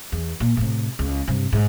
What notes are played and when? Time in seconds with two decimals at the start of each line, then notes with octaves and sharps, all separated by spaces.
0.12 E2
0.40 A#2
0.57 A2 C3
0.99 C#2
1.27 G2 C3
1.53 G#2